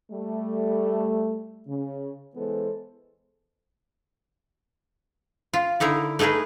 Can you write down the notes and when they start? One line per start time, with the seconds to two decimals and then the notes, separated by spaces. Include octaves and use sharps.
0.10 G3 A3
1.67 C#3
2.35 E3 G#3 B3 A4 C5
5.53 F4
5.80 D3 D#4 E4 A#4
6.19 A3 D#4 G#4 A#4 B4